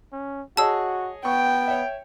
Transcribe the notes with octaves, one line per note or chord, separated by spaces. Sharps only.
C#4
F#4 G#4 C#5 D#5 A5 E6
B3 G5 C#6
C#5 E5